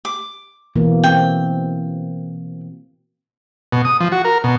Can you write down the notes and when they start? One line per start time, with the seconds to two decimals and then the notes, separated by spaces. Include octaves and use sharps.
0.05 D6
0.76 B2 E3 A#3
1.04 C4 G5
3.73 B2
3.85 D#6
4.00 F3
4.12 F#4
4.25 A#4
4.44 B2